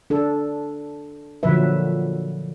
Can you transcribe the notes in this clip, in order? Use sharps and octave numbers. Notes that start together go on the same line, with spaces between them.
D4 A4
A#2 D3 F3 F#3 B4 E5